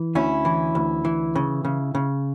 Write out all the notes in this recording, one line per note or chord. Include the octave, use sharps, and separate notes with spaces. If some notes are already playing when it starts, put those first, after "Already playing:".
Already playing: E3
D2 C#4 E4
E3
D2
E3
C#3
C#3
C#3